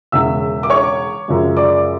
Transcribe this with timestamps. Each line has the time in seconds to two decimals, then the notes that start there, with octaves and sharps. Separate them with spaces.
0.12 E1 E2 C#3 E5 E6
0.63 D6
0.70 C#5 C#6
1.28 F#2 C#3 F3 G#3
1.57 D5 D6